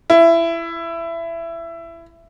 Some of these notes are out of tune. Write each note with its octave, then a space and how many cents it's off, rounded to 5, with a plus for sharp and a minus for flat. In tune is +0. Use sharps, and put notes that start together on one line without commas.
E4 +20